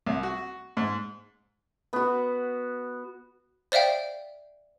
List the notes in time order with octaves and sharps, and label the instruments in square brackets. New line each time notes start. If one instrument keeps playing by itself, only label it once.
[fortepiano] C2
F#4
G#2
[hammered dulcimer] B3 F#4
[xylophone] C5 D5 E5 F5 G5